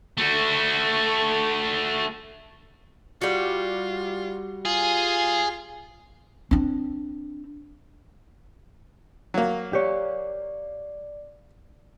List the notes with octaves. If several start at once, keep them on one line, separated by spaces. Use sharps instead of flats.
A3 F#4
G3 F4 F#4
F4 G#4
C4 D4
F#3 A#3
G4 C#5 D5